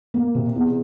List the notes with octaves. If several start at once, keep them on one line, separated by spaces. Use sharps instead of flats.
A#3
C3
E2